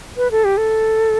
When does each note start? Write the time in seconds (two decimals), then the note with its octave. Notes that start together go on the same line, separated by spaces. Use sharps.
0.17 B4
0.31 A4
0.44 G4
0.57 A4